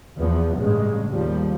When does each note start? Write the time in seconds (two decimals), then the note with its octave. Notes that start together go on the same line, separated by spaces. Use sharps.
0.17 E2 F3 B3
0.57 A1 G2 C#3 G#3
1.11 D#2 F3 G3